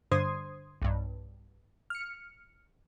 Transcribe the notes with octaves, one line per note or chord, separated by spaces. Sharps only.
G2 D3 C5 C6 D#6 G#6
B1 G2
F6 C#7